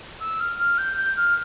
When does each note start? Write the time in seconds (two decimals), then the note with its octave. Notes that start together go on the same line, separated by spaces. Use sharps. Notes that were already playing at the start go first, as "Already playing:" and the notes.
0.20 E6
0.40 F6
0.59 F6
0.78 G6
0.97 G6
1.16 F6